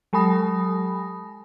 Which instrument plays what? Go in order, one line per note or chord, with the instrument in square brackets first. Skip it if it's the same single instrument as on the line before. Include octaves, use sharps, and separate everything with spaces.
[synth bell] F#3 G#3 G#5 B5 D#6 A#6